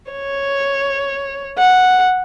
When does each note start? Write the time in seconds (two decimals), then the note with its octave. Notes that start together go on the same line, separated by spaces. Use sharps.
0.12 C#5
1.58 F#5